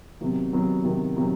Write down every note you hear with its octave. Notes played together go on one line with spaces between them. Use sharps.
C3 D#3 F#3 B3
C3 D#3 F#3 B3
C3 D#3 F#3 B3
C3 D#3 F#3 B3